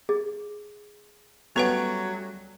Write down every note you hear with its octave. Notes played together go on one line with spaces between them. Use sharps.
G#4
F#3 G3 A3 B3 C#4 B4 F#5